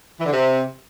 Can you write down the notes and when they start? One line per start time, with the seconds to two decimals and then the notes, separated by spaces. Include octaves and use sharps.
0.20 E3
0.26 D3
0.32 C3